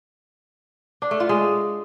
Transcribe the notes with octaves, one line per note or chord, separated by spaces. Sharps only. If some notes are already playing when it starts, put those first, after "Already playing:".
D4
A3
F4
G#3